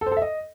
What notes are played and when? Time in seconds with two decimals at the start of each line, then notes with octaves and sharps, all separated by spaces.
0.01 A4
0.06 C5
0.12 A4
0.17 E5
0.22 D#5